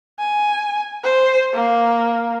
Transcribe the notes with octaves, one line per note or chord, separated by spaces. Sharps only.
G#5
C5
A#3